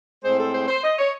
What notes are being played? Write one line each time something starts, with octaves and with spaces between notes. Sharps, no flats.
A2 G#3 C4 C5
A4
C5
C5
D#5
C#5